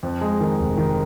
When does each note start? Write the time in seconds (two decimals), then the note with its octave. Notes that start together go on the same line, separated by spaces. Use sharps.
0.03 F2
0.21 G#3
0.40 D#3
0.59 F1
0.77 D#3